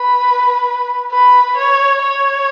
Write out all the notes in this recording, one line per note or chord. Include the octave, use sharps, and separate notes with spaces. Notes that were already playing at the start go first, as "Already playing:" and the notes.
Already playing: B4
B4
C#5
C#5